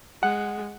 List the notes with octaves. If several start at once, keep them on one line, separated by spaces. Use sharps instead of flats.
G#3 F#5